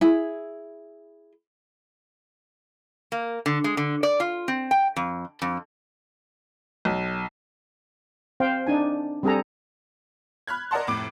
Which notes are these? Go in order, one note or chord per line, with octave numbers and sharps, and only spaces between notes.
E4 G#4
A#3
D3
G#3
D3
D5
F4
C4
G5
F2
F2
B1
C4 C5 F5 G5
D4 D#4 G#5
G3 C4 G#4 A4 A#5
B5 F6 F#6 G#6
A#4 D5 D#5 F#5 A5 C6
F1 A2 D6 D7